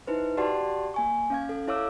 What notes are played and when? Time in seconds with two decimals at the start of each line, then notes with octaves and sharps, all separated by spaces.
0.07 D#4 E4 B4 C5
0.37 F#4 G4 D5 F#5 A5 C6
0.94 A#3 G#5 C#6
1.30 C#4 F5 G#6
1.49 A4
1.68 E4 A4 C#5 F5 D6 E6